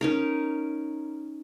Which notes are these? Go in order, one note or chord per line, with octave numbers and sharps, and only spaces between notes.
C#4 D#4 A#4